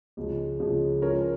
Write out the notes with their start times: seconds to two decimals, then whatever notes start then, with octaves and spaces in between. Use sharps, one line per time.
0.17 C#2 C#3 F3
0.60 C#2 C#3 F3
1.02 F3 C#4 A#4 C#5